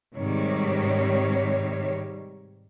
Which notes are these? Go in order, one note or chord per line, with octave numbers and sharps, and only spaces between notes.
G#2 C3 D#3 G3 C#5